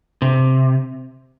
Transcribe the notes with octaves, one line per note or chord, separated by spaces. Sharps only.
C3